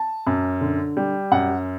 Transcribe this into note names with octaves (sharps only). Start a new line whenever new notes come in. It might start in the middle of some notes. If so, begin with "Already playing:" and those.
Already playing: A5
F#2
D3
G3
F#2 F#5